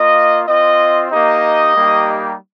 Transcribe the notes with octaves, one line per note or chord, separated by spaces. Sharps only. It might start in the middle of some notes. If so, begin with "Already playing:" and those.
Already playing: A#3 F4 D#5
C4 F4 D#5
A#3 D#4 G4 D#5
G3 A#3 D#4 G4